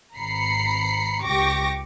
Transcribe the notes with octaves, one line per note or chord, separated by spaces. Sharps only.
G#1 A#5 B5 C7 C#7
C#2 G4 C#6 D6 A#6